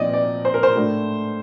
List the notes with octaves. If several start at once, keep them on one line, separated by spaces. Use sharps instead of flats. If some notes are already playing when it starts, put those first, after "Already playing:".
Already playing: A#2 F3 C4 D#4 D5 D#5
D5
C5
A#4
C5
A2 A3 D4